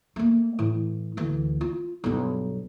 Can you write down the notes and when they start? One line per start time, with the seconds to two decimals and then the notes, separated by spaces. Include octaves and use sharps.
0.16 A3 A#3
0.59 A2 E3
1.17 D2 E3
1.61 F4
2.04 B1 G2